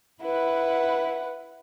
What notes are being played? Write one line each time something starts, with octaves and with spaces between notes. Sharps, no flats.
E4 B4 F#5